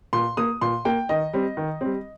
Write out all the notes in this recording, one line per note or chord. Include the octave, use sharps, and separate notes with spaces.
A#2 C6
A#3 D#6
A#2 C6
A#3 G5
D#3 D#5
G3 C4
D#3
G3 C4